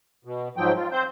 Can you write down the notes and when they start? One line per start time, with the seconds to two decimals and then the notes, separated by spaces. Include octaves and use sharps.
0.25 B2
0.57 G#2 F3 F#3 G5
0.76 F4
0.92 C4 C5 G6